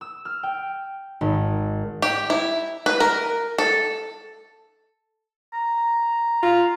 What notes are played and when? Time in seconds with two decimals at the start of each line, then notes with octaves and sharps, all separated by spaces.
0.01 E6
0.25 F6
0.43 G5
1.21 G#1
2.02 G4
2.30 E4
2.86 B4
3.00 A#4
3.58 A4
5.53 A#5
6.43 F4 A#5